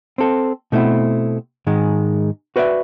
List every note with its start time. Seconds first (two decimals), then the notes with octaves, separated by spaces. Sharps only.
0.18 C4 A4
0.72 B2 A3 C4 E4
1.67 G#2 D#3 G#3
2.56 F#4 B4 C#5 D5 E5